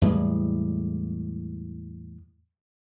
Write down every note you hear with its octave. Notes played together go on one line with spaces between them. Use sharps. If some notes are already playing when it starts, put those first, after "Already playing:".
E2 A2 G3 G#3